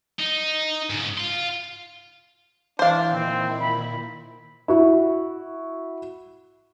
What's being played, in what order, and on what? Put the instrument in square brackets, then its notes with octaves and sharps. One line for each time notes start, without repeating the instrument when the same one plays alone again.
[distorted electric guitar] D#4
G#2 C#3
F5 C6
[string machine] E3 E5 [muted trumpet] D4 [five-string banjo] C5 F5
[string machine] A#2 D#3 E4 [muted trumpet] C4
[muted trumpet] B5
[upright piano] E4 F#4